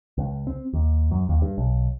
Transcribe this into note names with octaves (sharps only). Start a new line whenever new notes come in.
C#2
C4
D#2
F#2
D#2
G2
B1